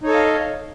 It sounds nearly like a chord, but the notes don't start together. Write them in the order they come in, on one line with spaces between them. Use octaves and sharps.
D#4 C#5 A4 D#5 F5